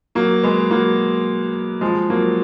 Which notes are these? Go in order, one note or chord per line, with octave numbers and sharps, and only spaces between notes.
F#3 A#3
G#3 B3
F#3 A#3
F3 G#3
F#3 A#3